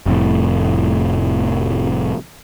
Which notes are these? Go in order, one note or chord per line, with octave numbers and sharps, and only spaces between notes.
F1 F2 A2